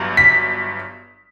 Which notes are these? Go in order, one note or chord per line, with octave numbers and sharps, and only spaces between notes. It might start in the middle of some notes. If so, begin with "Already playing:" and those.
Already playing: G1 G2 F#3
B6